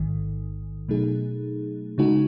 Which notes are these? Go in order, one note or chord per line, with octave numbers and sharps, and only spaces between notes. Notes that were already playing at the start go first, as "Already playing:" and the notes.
Already playing: A1 G#2 D#3
B2 F#3 A3 D#4 G#4
C#3 G#3 D#4 F#4